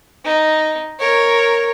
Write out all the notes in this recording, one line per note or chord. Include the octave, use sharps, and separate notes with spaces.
D#4
A#4 C#5